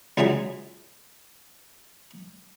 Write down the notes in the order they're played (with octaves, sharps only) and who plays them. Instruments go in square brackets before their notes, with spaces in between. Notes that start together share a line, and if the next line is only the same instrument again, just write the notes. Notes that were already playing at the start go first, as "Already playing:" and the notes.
[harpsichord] C#2 D3 E3 F#3 G#4